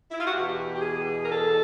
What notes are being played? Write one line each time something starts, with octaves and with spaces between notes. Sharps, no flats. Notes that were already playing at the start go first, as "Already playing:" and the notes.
E4
F4
F#4
E2 B2 G4
G4
G#4
A#4
A4